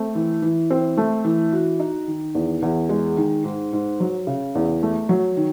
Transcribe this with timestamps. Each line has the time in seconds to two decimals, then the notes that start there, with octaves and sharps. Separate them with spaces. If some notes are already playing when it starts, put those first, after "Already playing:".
Already playing: A3 C4
0.15 E3
0.42 E3
0.70 C4
0.97 A3
1.24 E3
1.53 F#4
1.80 D#4
2.07 D#3
2.35 E2
2.62 E2
2.89 G#3
3.17 D#3
3.44 G#2
3.73 G#2
4.00 F#3
4.27 C#3
4.55 E2
4.83 A3
5.09 F#3
5.37 D#3